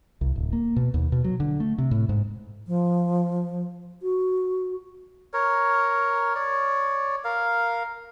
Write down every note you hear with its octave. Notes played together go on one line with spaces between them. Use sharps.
C2
D1
A#3
B2
D#2
B2
F#3
D3
A3
C3
A2
G#2
F3
F#4
A#4 C#5
C#5 D5
A#4 F5